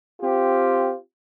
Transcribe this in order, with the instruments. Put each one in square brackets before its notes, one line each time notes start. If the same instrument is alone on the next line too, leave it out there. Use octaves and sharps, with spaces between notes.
[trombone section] C4 F4 G4